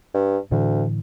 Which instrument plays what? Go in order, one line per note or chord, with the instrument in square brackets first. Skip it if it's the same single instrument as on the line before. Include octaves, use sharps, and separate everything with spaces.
[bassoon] G2
[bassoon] D2 [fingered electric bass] A2 D3 E3